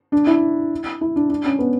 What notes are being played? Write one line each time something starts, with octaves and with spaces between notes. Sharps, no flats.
D4
E4
E4
D4
D4
C#4
B3